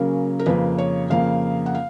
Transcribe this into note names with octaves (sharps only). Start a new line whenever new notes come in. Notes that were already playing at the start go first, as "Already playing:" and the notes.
Already playing: C#3 F#3 A#3 C#4 A#4
A#4
F2 C#3 F3 A#3 B4
C#5
F2 C#3 F3 A#3 F5
F#5
F5